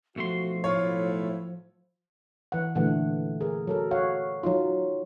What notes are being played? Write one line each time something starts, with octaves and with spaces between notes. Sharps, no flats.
B1 F3 A3 F#4 C6
A2 E4 F4 C#5
E3 F#5
A#2 D3 E3 A3 F#5
G#4 A#4
F#3 A4 A#4
F#4 C#5 F5 F#5
F#3 D#4 F4